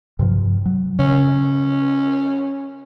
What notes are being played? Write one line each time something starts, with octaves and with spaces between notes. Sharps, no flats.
G2 C3 F3
F#3
C#3 C#4